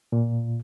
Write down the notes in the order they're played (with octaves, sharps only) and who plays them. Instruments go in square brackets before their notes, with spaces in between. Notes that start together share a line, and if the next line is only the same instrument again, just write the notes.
[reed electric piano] A#2